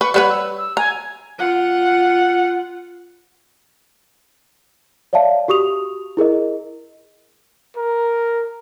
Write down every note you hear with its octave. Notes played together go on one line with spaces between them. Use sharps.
B4 C#6
G3 B4 C#5 F#5
E6
E6
G#5 A#5
F4 F#5
C#5 D5 E5 F5 A5
F#4 G4 C#6 D#6 F7
E4 G#4 A#4 D#5
A#4